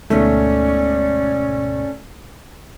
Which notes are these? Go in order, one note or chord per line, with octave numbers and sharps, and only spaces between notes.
D2 G#2 B2 A3 C#4 D5